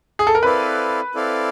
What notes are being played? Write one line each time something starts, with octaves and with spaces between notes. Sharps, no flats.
G#4
A4
A#4
C4 E4 A4 B4 D5 F5
C4 E4 A4 D5 F5